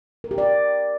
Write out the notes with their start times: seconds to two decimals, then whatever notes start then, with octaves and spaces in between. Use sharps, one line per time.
0.24 A#4
0.31 G4
0.38 D5